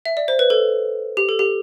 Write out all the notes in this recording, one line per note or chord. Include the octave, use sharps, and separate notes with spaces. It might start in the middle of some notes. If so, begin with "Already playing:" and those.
E5
D5
C5
B4
A4
G4
A4
G4